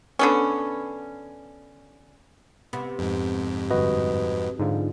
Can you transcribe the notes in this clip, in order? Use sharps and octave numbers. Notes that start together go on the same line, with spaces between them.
D3 B3 C#4
C3 B3
F2 G#2
G1 G2 F#4 B4 D#5
G#2 D3 F3